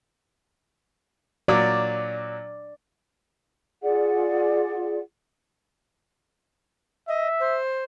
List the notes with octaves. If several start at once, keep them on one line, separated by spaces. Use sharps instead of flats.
A#2 F#3 D5
F4 G#4 D5 F#5
D#5 E5
C5